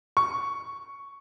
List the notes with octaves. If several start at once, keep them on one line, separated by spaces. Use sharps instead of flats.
C#6